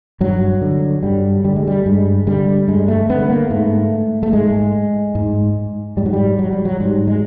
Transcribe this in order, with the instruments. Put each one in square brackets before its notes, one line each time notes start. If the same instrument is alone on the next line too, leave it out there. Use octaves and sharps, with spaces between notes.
[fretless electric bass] G2 F#3
D3
G2 G3
D3 G3
G#3
G3
G2 G#3
D3 G3
G2 G#3
A3
D3 B3
A#3
G#2 A3
A3
G#2 G#3
G#2
G#2 G3
F#3
G3
F#3
G3
F#3
G#2 G3
G#3